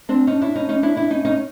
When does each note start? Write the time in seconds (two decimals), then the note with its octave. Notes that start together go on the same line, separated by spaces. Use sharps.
0.09 C4 D4
0.27 C#4 D#4
0.41 D4 E4
0.55 C#4 D#4
0.69 C#4 D#4
0.83 D4 E4
0.96 D4 E4
1.10 C#4 D#4
1.25 C#4 D#4